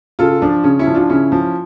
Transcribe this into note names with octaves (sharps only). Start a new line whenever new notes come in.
C#3 F4 A4
F3 D4
C#3 C#4
C#4 E4
F3
D4 F4
C#3 C#4 E4
F3